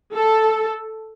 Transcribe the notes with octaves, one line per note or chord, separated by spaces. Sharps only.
A4